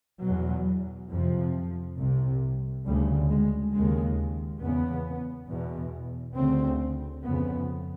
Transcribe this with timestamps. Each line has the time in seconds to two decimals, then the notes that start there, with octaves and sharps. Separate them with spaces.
0.23 E2 B2 F#3
1.11 F2 C3 F3
1.98 C2 C3
2.86 D2 C#3 G3
3.30 G#3
3.73 D#2 C#3 G#3
4.61 E2 C#3 B3
5.49 E2 B2
6.37 D2 C#3 C4
7.24 F2 C#3 B3